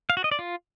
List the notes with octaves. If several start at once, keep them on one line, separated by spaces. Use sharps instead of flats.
F5
F#4
D#5
D5
F4